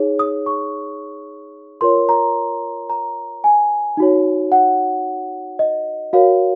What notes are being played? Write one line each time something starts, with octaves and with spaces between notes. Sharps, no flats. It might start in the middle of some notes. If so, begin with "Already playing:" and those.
Already playing: D#4 G#4 C#5
D#6
C#6
F4 A#4 C#5 C6
A#5
A#5
G#5
D#4 F#4 C#5
F#5
D#5
F#4 A#4 C#5 F5